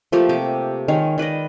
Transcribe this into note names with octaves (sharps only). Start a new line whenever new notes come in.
F3 A3 A#3 G4
C3 G4 D6
D#3 G#3 C#5 F5
D#3 B4 D5 D#5